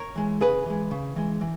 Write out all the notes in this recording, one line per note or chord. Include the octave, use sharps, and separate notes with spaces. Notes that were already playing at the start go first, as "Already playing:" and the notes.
Already playing: A#4 C#5
E3 G#3
C#3 G#4 B4
E3 G#3
C#3
E3 G#3
E3